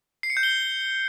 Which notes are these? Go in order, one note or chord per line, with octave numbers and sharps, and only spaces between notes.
C7
C#7
G6
G7